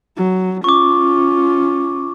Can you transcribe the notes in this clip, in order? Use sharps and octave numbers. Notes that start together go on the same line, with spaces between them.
F#3
C#4 F4 C#6 D6